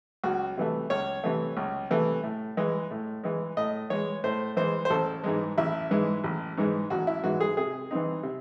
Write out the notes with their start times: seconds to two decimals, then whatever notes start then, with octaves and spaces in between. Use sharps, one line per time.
0.24 C#2 F#4
0.57 C3 E3 A3
0.90 C#2 C#5
1.24 C3 E3 A3
1.57 C#2
1.90 C3 E3 A3
2.23 A2
2.57 E3 G#3
2.91 A2
3.23 E3 G#3
3.57 A2 D#5
3.90 E3 G#3 C#5
4.24 A2 C5
4.57 E3 G#3 C5
4.85 C5
4.90 A1 A4
5.24 G#2 E3 G#3
5.57 A1 E4
5.90 G#2 E3 G#3
6.24 A1
6.57 G#2 E3 G#3
6.90 A1 F#4
7.07 E4
7.24 G#2 E3 G#3 F#4
7.40 G#4
7.57 C3 G#4
7.91 E3 C4 D#4
8.23 C3